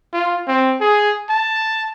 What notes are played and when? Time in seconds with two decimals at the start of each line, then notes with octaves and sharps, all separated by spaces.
0.13 F4
0.48 C4
0.81 G#4
1.30 A5